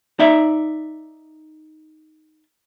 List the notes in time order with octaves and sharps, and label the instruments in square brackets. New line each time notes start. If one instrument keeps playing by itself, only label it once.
[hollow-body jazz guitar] D#4 D5 E5